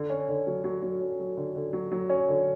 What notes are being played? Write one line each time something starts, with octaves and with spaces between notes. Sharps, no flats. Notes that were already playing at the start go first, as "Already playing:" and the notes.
Already playing: D3
C#4
D3
F#3
F#3
F#3
C#4
F#3
D3
D3
F#3
F#3
C#4
D3